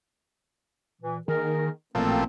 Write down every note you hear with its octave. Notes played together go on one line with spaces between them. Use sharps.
A#2 E3
D#3 A#3 G#4 A#4
A1 A#2 F3 A3 A#3 C4